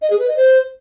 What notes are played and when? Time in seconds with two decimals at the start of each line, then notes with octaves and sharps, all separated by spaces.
0.02 D#5
0.10 G#4
0.19 B4
0.28 D#5
0.37 C5